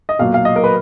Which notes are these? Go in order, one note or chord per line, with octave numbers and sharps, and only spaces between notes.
D#5
B1 A#2 F#3 F5
F5
D#5
A#4
B4